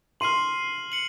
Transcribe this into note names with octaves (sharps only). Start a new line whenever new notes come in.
C6 F6 C7 D#7 F#7
C#7 F#7